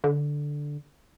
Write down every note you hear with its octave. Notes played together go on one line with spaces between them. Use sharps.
D3